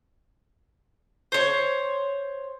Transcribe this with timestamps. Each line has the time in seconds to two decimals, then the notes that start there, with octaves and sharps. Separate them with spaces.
1.32 C5 C#5